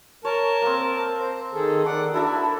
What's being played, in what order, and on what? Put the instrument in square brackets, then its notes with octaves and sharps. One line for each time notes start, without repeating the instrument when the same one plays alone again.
[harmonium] A#4 A5 [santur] C#5
[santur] A#3 C4
[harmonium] C5
D#3 G#4 A4
[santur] D5 D6 [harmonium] F#5
[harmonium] D4 F#4 [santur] E4 A4 E5